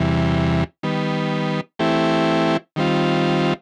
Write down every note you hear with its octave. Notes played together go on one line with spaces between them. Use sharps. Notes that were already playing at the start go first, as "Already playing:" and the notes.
Already playing: E2 C3 E3 G3
D#3 G3 B3
E3 A3 C4 E4 G4
D#3 G3 C4 F4